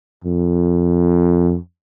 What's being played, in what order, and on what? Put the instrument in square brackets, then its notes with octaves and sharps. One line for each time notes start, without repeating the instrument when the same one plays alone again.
[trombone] F2